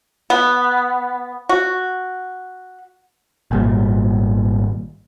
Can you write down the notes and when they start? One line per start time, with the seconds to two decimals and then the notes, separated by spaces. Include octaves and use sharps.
0.30 B3
1.49 F#4
3.51 G#1 A#2 G3